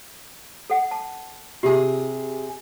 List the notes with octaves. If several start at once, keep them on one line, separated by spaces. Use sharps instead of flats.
A4 F#5
A5
C3 F4 G4 G#4